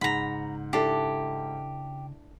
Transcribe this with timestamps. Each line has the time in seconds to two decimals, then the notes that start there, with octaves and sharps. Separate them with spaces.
0.01 G#2 C#3 F#5 A#5 B5
0.73 D4 E4 G4 A4